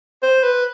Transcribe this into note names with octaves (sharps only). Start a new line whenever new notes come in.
C5
B4